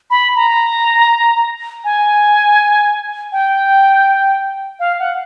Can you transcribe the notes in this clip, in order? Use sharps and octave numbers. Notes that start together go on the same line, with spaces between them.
B5
A#5
G#5
G5
F5
F#5